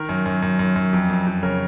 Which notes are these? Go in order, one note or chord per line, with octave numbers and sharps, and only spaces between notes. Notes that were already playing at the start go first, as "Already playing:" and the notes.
Already playing: D#3 A#4
F#2
F#2
F#2
F#2
F#2
F2
F2
F2
C#3 A#4 C#5